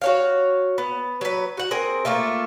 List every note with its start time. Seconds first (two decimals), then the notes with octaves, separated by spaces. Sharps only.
0.01 F#4 C#5 F5
0.78 B3
1.21 F#3 B4
1.57 F#4 F#5
1.71 C4 G#4 A#4
2.05 A3 A#3 F4 E5